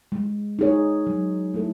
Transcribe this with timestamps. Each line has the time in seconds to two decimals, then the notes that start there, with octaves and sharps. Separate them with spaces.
0.12 G#3
0.59 D#4 G#4 C#5
1.07 F#3
1.54 A3 E4 A4